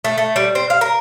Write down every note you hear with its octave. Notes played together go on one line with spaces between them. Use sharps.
A3
A3
G3
C4
F5
A#4